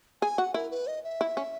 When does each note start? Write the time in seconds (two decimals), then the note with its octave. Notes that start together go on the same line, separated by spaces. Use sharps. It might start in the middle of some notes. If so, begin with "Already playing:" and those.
0.22 G#4 G#5
0.38 F#4 F#5
0.54 E4 A#4
0.71 B4
0.87 D#5
1.04 E5
1.21 E4
1.37 C#4